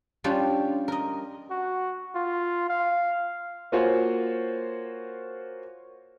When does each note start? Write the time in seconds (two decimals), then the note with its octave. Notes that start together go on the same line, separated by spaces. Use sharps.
0.24 G3 C#4 D4 F4 G4
0.88 A#4 D#5
1.51 F#4
2.15 F4
2.69 F5
3.72 A#3 F4 F#4 C5 C#5 G#5